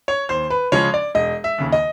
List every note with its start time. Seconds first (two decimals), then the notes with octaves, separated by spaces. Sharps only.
0.08 C#5
0.29 D#2 C5
0.50 B4
0.72 C#3 F3 G#3 C#4 C#5
0.94 D5
1.15 E1 D#5
1.44 E5
1.58 D#2 C#3
1.72 D#5